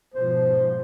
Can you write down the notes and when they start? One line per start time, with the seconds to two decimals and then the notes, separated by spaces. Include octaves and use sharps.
0.14 G#2 B2 F3 C5